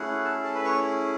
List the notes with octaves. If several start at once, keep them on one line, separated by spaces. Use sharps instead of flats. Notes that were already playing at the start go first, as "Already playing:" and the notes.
Already playing: A3 C#4 E4 F#4 G#4 F#5
A4 A5
A4 A5
B4 B5
C#5 C#6